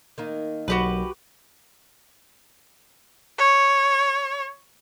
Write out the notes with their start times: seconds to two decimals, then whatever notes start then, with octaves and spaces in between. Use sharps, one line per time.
0.18 D#3 A#3 D#4
0.68 B1 F#3 F#4 G4 B4
3.38 C#5